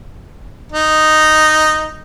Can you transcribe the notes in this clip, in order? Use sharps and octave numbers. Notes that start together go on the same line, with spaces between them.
D#4